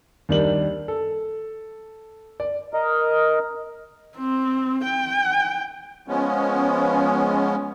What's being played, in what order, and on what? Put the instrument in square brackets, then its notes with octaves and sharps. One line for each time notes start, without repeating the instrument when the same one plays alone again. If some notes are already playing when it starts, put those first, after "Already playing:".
[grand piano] D#2 D#3 G3 D4 F#7
A4
D5
[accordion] A#4 D#5
[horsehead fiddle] C4
G5
[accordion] F3 G#3 B3 C#4